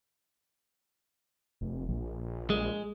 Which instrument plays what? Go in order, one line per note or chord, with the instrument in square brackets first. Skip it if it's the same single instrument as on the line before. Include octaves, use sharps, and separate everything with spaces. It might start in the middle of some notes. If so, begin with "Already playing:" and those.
[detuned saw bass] F1
A#1
[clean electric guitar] G#3